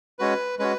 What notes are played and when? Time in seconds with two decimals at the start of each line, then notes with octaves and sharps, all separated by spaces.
0.19 G#3 C#4 F#4 B4
0.59 G#3 C#4 F#4 B4